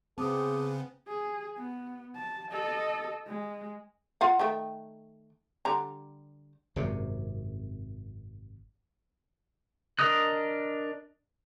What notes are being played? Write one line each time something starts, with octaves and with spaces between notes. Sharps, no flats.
C#3 B3 C4 G#4 A5 D6 D#6
G#4
B3
A5
A4 D#5
G#3
F4 F5 F#5
D#3 A3 G5
D3 G3 A#5
G#1 F#2 C3
D4 A#4 D#5 D#6 F#6